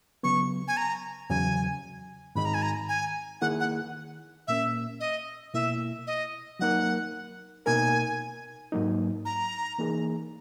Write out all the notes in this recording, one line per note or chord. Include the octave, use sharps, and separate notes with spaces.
C#3 F#3 B3 C#6
G#5
A#5
E2 C#3 F#3 G#5
G#2 D#3 G#3 D#4 B5
A#5
G#5
A#5
G#5
D#3 A#3 E4 G#4 F#5
F#5
A#2 A#3 C#4 E5
D#5
B2 A#3 E4 E5
D#5
F#3 A#3 D#4 A#4 F#5
B2 A#3 D#4 A#4 G#5
G#2 F#3 A#3 D#4
A#5
E3 A#3 D#4 G#4